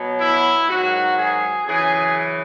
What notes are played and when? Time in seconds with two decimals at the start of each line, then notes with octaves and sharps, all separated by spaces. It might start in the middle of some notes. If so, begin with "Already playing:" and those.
Already playing: B2 F#3
0.19 E4
0.67 G#2 D#3 F#3 F#4
1.16 G#4
1.66 F#2 C#3 E3 G#4